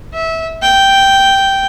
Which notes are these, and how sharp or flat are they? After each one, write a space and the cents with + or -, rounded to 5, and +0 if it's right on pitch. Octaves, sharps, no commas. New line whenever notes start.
E5 -20
G5 -5